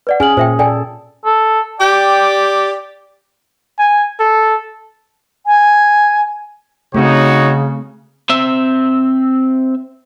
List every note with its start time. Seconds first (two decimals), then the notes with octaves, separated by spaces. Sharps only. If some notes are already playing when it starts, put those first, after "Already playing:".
0.07 B4 D5 F#5
0.20 C#4 G#4 G#5 F6 F#7
0.37 A#2 C5 E5 G5
0.59 A4 D5 G5 G#5
1.25 A4
1.80 G4 D5 G5
3.79 G#5
4.20 A4
5.46 G#5
6.94 C#3 A3 C4 D#4 F#4 C#5
8.30 C4 E5